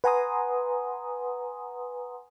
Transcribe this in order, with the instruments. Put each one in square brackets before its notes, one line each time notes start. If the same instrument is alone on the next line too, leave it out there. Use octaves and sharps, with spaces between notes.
[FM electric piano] B4 F#5 G#5 A#5 C6 D#6